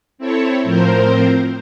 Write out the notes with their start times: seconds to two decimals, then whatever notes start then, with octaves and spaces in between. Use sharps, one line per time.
0.18 C4 E4 A4 C#5
0.63 A2 F3 C4 A#4 C5